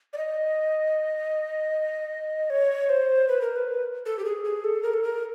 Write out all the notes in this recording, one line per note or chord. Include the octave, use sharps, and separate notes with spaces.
D5
D#5
C#5
C5
B4
A#4
B4
A4
G4
G#4
G#4
A4
A#4
A4
A#4